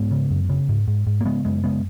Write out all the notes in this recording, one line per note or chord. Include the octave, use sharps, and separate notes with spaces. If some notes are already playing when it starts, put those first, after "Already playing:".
Already playing: G#2 G#3 B3
C#3
F#2
C#3
G#2
G#2
G#2
A#3
C#3 G#3 B3
F#2 G#3 B3
C#3 G#3 B3